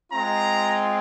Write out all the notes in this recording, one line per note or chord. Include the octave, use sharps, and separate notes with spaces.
G#3 C4 F4 A#5